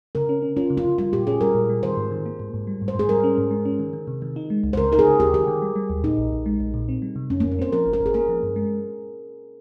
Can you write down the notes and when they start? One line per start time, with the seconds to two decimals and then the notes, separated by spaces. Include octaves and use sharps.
0.15 C#3 A#4
0.29 C#4
0.42 C#4
0.56 C#4 F4
0.70 C#3
0.77 F4
0.85 C#3
0.98 G3 F4
1.13 A#2 G4
1.27 C#4 G#4
1.41 G3 A#4
1.55 A#2
1.69 G3
1.83 D#3 C5
1.97 G#2
2.11 D#3
2.26 A#3
2.40 G#2
2.54 G#2
2.67 G3
2.82 G#2
2.88 C5
2.95 G#2 G#4
3.09 G3 A#4
3.24 C#4
3.38 G#2
3.51 G#3
3.65 C#4
3.79 D#3
3.93 D#3
4.08 C3
4.22 D#3
4.36 D#4
4.50 G#3
4.64 C#2
4.73 C5
4.77 C#3 A#4
4.92 D#4 A#4
4.99 G#4
5.05 C#3
5.20 D#2 G4
5.34 D#3 G4
5.48 D#3
5.62 G3
5.76 G3
5.90 D#2
6.04 A#2 D#4
6.18 A#1
6.33 A#1
6.46 G#3
6.60 A#1
6.74 A#2
6.89 C4
7.02 G3
7.16 C3
7.30 F2 C#4
7.40 F2 A#3
7.52 C#4
7.59 C4 C5
7.72 F3 A#4
7.86 G#1
7.93 A#4
8.00 G#1
8.06 G#4
8.14 A#3 A#4
8.29 F3
8.43 G2
8.56 G#3